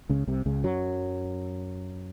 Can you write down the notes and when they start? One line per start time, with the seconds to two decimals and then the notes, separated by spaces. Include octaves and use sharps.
0.09 C#2 C#3
0.27 C2 C3
0.46 C#2 C#3
0.64 F#2 F#3